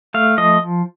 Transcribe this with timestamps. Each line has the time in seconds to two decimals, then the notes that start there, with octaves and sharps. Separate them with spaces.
0.14 A3 F5
0.38 F3 D#5